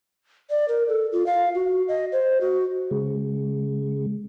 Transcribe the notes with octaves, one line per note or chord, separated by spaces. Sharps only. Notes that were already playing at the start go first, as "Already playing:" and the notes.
D5
A#4
A4
F4
F5
F#4
D#5
C5
F#4
C#3 G#3